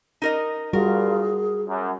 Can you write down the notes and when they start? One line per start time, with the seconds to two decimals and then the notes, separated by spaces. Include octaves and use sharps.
0.22 D#4 A#4 D#5
0.73 G2 A#2 G3 F4 F#4 G#4 A#4
1.67 F#2